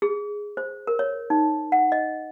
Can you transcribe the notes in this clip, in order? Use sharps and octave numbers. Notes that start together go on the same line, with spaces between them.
G#4
C5
A#4
C#5
D#4
F#5
D#5